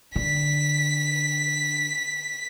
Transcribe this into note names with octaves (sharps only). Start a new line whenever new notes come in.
D3 B6